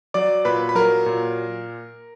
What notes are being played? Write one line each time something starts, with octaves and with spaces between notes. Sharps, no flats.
F#3 D5 D6
A#2 B4 B5
B5
F#3 A#4 A#5
A#2